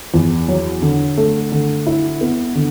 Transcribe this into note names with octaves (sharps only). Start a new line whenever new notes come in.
E2
F#3
D3
A3
D3
E4
B3
D3